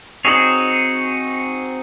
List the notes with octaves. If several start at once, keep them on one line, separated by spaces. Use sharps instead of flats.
C4 D#4 F#4 G#4 C#5